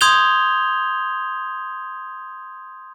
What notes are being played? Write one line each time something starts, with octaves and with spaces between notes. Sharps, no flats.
C6 D#6 G6 G#6 F7 G7